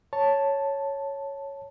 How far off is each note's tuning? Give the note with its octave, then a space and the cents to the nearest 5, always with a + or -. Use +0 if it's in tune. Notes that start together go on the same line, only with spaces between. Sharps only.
C#5 +0 A5 +0